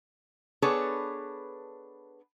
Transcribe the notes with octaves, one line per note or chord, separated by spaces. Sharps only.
B3 D4 G#4 A4 B4 C#5